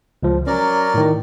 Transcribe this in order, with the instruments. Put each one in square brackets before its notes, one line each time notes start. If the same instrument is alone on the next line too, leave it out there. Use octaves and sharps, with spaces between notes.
[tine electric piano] C#2 F3
[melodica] F#3 A#4 D5 [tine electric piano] C#4
[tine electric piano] A2 D#3